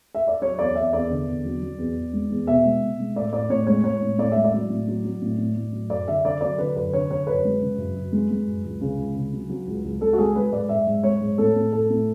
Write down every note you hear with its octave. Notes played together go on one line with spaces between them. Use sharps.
E5
D5
F#3 C#5
E2 D5
E2 E5
E2 D5
D3
E2
F#3
F#3
E2
E2
G#3
E2
B2 E5
G#3
B2
G#3
A2 D5
A2 D5
A2 C#5
G#3 C#5
G#3 C#5
A2
A2 D5
G#3 E5
D5
F#3
A2
F#3
F#3
A2
A2
A2
F#3
F#2 D5
D3 E5
D3 D5
F#3 D5
D3 B4
F#2 B4
D3 C#5
D3 C#5
F#2 B4
G#3
C#3
F#2
F#2
G#3
G#3
F#2
C#2
C#3
C#2
C#3
F#3
F#3
C#2
C#2
G#3 A4
F#4
G#3 G#4
G#3 B4
G#2 D5
G#2 E5
G#2
G#3 C#5
G#2
A2 A4
A2
A2 A4
A2